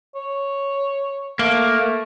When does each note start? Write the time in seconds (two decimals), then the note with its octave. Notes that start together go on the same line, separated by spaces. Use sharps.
0.15 C#5
1.39 A3 A#3